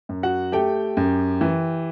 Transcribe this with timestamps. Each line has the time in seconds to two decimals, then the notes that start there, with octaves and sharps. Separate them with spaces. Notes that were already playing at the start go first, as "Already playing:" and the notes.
0.09 F#2
0.23 F#4 F#5
0.52 A3 G4 G5
0.97 F#2
1.41 E3